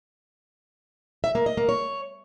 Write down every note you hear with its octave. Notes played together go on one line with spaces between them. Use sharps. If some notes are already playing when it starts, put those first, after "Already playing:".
E5
A#3
D#5
A#3
C#5